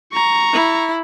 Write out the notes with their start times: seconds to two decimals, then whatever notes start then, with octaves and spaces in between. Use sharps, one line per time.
0.13 A#5 C#6
0.53 E4